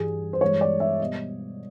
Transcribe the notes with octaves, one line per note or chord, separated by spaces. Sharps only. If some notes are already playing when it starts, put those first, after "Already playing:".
Already playing: G2 E3 G3 G#4
C5
G2 E3 G#3 C#5
D5
E5
B2 G3 D#5